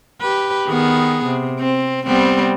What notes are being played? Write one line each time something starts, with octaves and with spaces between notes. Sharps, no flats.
G4 B4
D#3 B3 G#4
C3
C4
G3 B3 C4